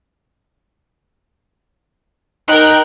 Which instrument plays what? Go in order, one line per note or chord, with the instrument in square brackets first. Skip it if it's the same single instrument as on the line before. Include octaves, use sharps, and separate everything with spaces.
[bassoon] D#4 [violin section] A#4 G5 F#6